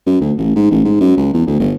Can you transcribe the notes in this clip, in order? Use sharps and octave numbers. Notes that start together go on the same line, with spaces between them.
F#2
D2
A1
G#2
A1
G#2
F#2
C#2
E2
D2
G1